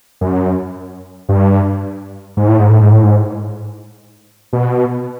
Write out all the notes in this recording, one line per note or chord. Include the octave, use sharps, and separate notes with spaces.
F#2
G2
G#2
A2
G#2
A2
G#2
A2
G#2
B2